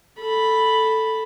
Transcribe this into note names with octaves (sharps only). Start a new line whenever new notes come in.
A4 B5